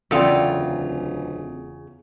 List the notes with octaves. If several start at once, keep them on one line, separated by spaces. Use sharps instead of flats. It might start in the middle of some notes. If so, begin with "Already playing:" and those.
D1 E2 C#3 F4 A4 D5 G5